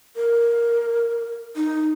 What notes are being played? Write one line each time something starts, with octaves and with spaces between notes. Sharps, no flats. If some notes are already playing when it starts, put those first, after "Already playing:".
A#4
D#4